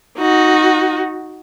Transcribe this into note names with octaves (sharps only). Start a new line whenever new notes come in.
D#4 F#4